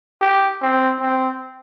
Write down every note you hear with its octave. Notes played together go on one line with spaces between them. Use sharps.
G4
C4
C4